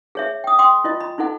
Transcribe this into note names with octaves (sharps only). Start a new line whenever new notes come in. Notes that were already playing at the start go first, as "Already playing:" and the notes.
G#4 C#5 E5
G5 D#6
G5 C6 D6 D#6
E4 F4 D#5
B5
D#4 E4 A4 F#5